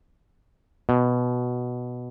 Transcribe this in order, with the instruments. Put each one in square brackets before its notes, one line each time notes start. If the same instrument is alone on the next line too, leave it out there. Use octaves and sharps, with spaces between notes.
[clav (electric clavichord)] B2